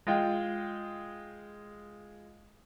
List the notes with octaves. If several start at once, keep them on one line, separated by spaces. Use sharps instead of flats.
G#3 F4 D#5 F5 G5